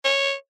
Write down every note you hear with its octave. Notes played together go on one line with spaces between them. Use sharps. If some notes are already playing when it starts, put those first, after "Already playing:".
C#5